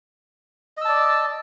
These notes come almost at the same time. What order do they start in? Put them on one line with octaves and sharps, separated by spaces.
D#5 E6 A5 D5